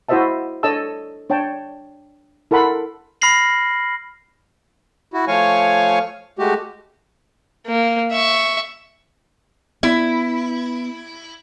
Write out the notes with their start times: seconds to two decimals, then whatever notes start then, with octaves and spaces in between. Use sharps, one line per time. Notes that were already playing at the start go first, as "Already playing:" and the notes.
0.09 E4 F#4 C5 D#5 E5 A5
0.63 D4 A4 C#5 D#5 A5 E6
1.30 D4 C#5 G5 A5
2.51 E4 A4 A#4 F#5 B5 C6
3.21 B5 F6 A#6 C7 F#7
5.14 E4 F#4
5.28 F3 A3 C#5 F5 G#5 C#6
6.39 G#3 A3 F#4 G4
7.66 A#3
8.11 E5 C#6
9.83 B3 E4